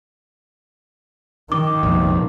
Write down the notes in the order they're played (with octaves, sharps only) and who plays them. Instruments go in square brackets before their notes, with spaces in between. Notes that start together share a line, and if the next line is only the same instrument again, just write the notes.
[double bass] D#3 [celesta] D6
[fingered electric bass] F1 A#1